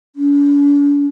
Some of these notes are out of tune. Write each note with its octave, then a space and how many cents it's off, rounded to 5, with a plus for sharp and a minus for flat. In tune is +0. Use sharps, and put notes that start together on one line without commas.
D4 -45